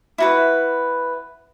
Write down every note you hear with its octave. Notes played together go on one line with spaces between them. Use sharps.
E4 F#4 B4